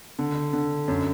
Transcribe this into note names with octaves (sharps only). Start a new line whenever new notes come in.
D3
D3
F#2